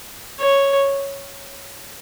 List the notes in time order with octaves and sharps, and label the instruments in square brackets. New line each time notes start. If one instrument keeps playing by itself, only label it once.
[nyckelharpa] C#5